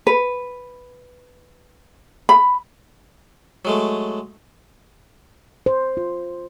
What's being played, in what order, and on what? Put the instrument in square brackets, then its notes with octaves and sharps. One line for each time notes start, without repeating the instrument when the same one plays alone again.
[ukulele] B4
B5
[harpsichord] F#3 G#3 A3
[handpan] C5
F4